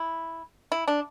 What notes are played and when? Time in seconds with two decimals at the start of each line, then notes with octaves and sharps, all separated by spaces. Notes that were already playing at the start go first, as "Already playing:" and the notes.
Already playing: E4
0.72 E4
0.88 D4